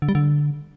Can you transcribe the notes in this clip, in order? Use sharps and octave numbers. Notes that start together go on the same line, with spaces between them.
D3
G3
D3